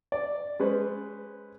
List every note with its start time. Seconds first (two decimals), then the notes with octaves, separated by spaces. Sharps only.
0.12 D5
0.60 G#3 C#4 B4 C5